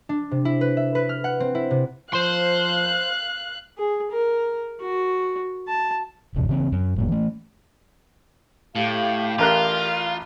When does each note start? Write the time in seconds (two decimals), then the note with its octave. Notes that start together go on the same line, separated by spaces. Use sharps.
0.09 D4
0.31 C3
0.45 E4
0.61 B4
0.77 E5
0.95 B4
1.09 F6
1.24 F#5
1.40 C4
1.55 E4
1.71 C3
2.13 F3 C5 F5 C6 F#6
3.78 G#4
4.11 A#4
4.81 F#4
5.67 A5
6.35 D#1 G#1 F2 C3
6.49 C#3 E3 C4
6.72 F#2
6.96 F#1 A2 A#3
7.09 E3 A3
8.75 A2 G4 F5
9.38 A1 F4 A#4 F#6